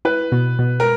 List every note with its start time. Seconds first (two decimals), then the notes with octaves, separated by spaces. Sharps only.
0.05 E4 B4
0.32 B2
0.59 B2
0.80 A#4